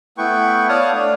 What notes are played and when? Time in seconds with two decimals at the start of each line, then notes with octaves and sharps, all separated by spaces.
0.18 A3 B3 E4 B4 G5 C#6
0.69 C#5 D5 F5 A5 D#6 F6
0.92 A3 D4